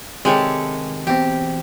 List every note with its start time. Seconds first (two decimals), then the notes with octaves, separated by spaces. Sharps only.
0.25 C3 D#3 G#3 G4 A4 C#5
1.07 E2 B2 C4 G4